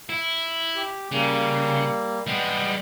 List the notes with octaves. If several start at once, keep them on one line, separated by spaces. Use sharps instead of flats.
E4
G4
C#3 G3 A#3
G3 G#3 B3